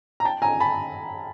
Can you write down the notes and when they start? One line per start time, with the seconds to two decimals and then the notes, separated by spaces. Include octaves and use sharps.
0.20 A#5
0.25 G5 A5
0.42 G#5 A#5
0.60 A5 B5